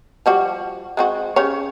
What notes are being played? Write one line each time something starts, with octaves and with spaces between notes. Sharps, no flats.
F3 G3 F#4
G#3 C4 F#4
C#3 G4 C#5